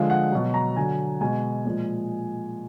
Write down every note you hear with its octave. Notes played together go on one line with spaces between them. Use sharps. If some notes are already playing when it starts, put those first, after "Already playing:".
Already playing: D3 F3 G#3 F5
F#5
B2 F#3
A#5
D3 F#3 G#5
B2 G#3 G#5
A#2 F3 G#3